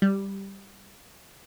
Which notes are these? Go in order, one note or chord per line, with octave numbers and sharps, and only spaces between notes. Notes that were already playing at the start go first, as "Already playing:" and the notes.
G3